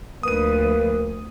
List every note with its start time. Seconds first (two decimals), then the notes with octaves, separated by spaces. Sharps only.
0.23 D2 F3 A#3 B4 D#6 D#7